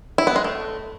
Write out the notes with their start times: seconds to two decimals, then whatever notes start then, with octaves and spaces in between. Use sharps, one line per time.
0.18 E4
0.27 B3
0.36 G#3
0.44 A3